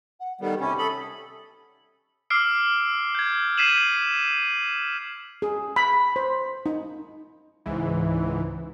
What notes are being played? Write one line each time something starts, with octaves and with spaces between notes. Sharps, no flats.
F#5
D#3 G3 B3 A4
C3 C#4 B5
A4 B5 D#6
D6 E6 F6 C7 D7
G6 G#6
G#6 B6 C7 D#7 E7 F#7
G#4
B5
C5
D#4
C#2 G#2 E3